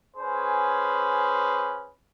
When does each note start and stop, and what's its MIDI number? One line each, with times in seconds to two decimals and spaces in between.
0.17 1.89 61
0.17 1.89 68
0.17 1.89 71
0.17 1.89 72